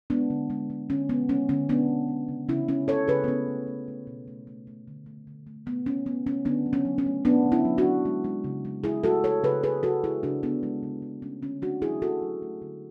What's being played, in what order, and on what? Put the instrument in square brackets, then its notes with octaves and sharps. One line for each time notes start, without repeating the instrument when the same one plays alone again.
[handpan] G#3 B3 D4
D3
G#3
G#3
D3 C#4
G#3 B3
G#3 C#4
D3 C#4
G#3 B3 D4
G#3
G#3
C#3
C#3 C#4 E4
G#3 C#4 E4
C#3 A4 C#5
C#3 G#4 B4
B3
A3 C#4
A3
A3
A3
B2
A3
A3
A3
D3
A3
D3
A3
A3 B3
A3 C#4
A3 B3
A3 C#4
D3 B3 D4
F#3
C#4
F#3
C#4
A3
A3 B3 D4
D3
C#4 E4
F#3
D4 F#4
F#3
G#3
G#3
C#3
G#3
G#3 E4 G#4
G#3 F#4 A4
C#3 A4 C#5
C#3 G#4 B4
C#3 G#4 B4
C#3 F#4 A4
G#3 E4 G#4
C#3 D4 F#4
C#3 B3 D4
G#3
C#3
G#3
A3 C#4
D3 C#4
A3 D4 F#4
F#3 E4 G#4
A3 F#4 A4
F#3
A3
D3